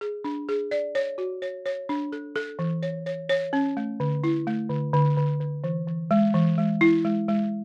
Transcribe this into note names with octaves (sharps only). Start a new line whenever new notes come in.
G#4
D4
G#4
D5
C#5
F#4
C#5
C#5
D4
A4
A4
E3
C#5
C#5
C#5
C#4
A3
D3
E4
A3
D3
D3
D3
D3
E3
E3
G#3
E3
G#3
E4
G#3
G#3